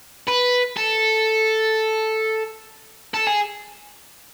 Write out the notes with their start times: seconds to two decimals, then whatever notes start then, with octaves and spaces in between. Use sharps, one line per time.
0.28 B4
0.77 A4
3.14 A4
3.27 G#4